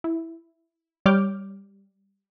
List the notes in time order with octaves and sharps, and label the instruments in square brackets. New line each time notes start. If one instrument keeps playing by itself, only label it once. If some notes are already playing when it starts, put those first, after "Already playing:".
[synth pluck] E4
G3 C#5 D6 F6 G6